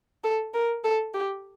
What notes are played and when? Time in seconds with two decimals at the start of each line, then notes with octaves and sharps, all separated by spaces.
0.24 A4
0.54 A#4
0.84 A4
1.14 G4